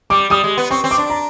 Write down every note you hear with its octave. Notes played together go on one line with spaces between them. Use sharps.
G3 D6
G3 D#6
G#3
B3
C4 C#6
C4
D6
D4
A#5